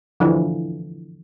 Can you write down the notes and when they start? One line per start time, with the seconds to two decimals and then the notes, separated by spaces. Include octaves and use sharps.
0.20 D3 E3 F3